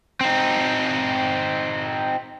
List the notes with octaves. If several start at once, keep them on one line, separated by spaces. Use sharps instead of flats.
C4 D#4